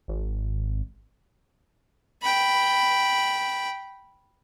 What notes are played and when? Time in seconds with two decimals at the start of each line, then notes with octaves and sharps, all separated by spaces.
0.08 G#1
2.22 G5 B5